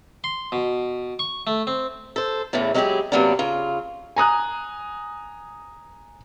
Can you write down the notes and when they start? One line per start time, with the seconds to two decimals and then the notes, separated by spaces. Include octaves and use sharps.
0.24 C6
0.52 B2
1.19 C#6
1.47 A3
1.67 C4
2.16 A4 C5
2.53 E2 A2 C#3 E3 A3
2.74 F#3 G#3 C#4 E4 G4 G#4
3.12 C3 E3 F#3 A#3 B3 D4
3.39 C#3 F4
4.16 G#5 A#5 D#6 F#6